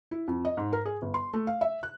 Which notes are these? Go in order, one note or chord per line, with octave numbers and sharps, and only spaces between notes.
E4
F2
D#5
G#2
A#4
G#4
G1
C6
A3
F5
E5
F#6